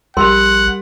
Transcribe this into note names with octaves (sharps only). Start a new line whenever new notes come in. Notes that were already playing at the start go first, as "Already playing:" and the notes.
A#1 G3 G#4 A#4 F#5 C6 F7